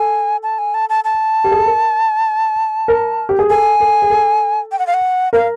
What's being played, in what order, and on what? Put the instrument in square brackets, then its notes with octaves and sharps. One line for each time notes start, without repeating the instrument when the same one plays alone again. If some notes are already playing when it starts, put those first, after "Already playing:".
Already playing: [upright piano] A4 [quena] G#5
[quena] A5
G#5
A5
A5
A5
[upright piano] G4
G#4
A4
A#4
A#4
G4
G#4
[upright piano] A4 [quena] G#5
[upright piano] A4
G#4
A4
[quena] G5
F#5
F5
F#5
[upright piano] A#4 [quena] F5